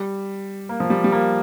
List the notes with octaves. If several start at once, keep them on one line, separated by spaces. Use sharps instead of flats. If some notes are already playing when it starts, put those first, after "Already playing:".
Already playing: G3
A#3
F3
G3
G3
A#3